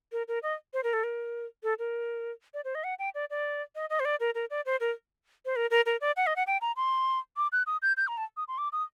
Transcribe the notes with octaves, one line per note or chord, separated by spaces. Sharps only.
A#4
A#4
D#5
C5
A#4
A4
A#4
A4
A#4
D5
C5
D#5
F#5
G5
D5
D5
D#5
D#5
C5
D5
A#4
A#4
D5
C5
A#4
C5
A#4
A#4
A#4
D5
F#5
D#5
F#5
G5
A#5
C6
D6
F#6
D#6
G6
G6
A#5
A5
D#6
C6
D6
D#6